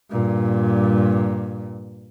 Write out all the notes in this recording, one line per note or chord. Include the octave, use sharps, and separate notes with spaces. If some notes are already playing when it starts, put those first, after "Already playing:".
G2 A#2